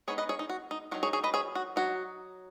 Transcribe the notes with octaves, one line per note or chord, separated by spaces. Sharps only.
G#3 B3 D#4 G#4 C#5
B4 D#5
G#4 C#5
D#4
F#4
D#4
D#3 F#3 D#4 F#4
G#4 C#5
G#4 C#5
B4 D#5
G#4 C#5
F#4
F#3 D#4 F#4